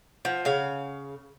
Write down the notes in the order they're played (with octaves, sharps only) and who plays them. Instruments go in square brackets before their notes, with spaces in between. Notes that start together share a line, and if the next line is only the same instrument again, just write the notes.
[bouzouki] F3 [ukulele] F#5
[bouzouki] C#3 F5 [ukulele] G#4 C#5 F#5